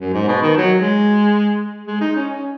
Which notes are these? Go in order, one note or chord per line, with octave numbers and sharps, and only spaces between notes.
F#2
G#2
B2
D#3
F#3
G#3
G#3
D#4
C#4
C#4